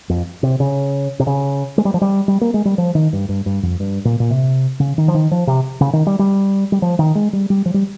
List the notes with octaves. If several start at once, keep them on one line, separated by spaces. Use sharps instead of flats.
F2
C3
C#3
C3
C#3
G#3
G3
F3
G3
G3
A#3
G#3
G3
F3
D#3
G2
G2
G2
F2
G2
A#2
A#2
C3
C#3
D#3
F3
D#3
F3
C3
C#3
D#3
G3
G3
G3
F3
D#3
G#3
G3
G3
F3
G3